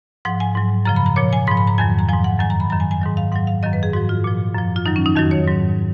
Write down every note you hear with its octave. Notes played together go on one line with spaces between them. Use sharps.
G#2 F3 F#5
G#5
G#2 F#3
F#2 C#3 F3 A#5
B5
A#5
A#2 F3 C#5
G#5
G#2 F3 B5
B5
A#5
F2 D#3 F#3 G#5
A#5
G#2 F3 G#5
F#5
F#2 D#3 F#3 G#5
A#5
B5
F#2 D#3 F#3 A#5
G#5
G#5
G#2 D#3 F#3
F5
G#2 F#3 F#5
F5
F#2 D#3 F#3 D#5
B4
G#4
G#2 F3 F#4
F4
A#2 F3
F#2 F3
F4
F#2 D#3 F#3 D#4
C#4
D#4
F2 D#3 F#3 F#4
C#5
G#2 F#3